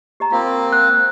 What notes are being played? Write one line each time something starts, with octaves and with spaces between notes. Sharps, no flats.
G4 D#5 A#5
A#3 C4 F4
F#5 E6 F#6